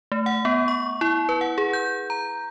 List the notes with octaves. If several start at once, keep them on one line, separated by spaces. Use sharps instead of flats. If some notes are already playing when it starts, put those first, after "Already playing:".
A3
F#5
B3
C#6
E4
B4
F#5
G#4
G6
A#5